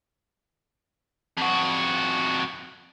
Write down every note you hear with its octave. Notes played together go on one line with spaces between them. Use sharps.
F2 F#4